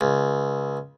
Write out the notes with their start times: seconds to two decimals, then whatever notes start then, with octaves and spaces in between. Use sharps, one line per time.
0.01 C#2